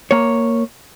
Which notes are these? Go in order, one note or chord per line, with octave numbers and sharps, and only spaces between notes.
A#3 C#5